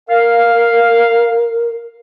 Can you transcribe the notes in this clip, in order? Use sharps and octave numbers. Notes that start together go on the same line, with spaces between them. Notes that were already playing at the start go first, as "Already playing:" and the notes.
A#4 F5